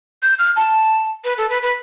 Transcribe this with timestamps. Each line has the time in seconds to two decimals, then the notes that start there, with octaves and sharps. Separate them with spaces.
0.22 G6
0.39 F6
0.56 A5
1.25 B4
1.38 A4
1.50 B4
1.62 B4